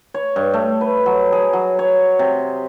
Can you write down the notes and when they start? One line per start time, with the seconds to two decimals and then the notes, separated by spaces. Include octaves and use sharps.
0.14 C#5
0.36 G2
0.54 A3
0.81 B4
1.06 F#3
1.32 G#4
1.53 F#3
1.79 C#5
2.19 C3